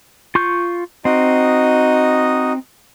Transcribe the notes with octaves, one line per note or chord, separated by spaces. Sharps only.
F4 C#6 G6
C4 D#4 F#4 D#5